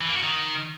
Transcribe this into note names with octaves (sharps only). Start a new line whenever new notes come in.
E3
A#3
F#4
D#3